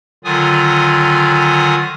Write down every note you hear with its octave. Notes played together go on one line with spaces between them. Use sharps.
D3 D#3 F#3 F4 G#5 D#6